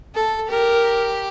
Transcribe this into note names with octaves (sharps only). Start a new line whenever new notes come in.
A4
G4 A#4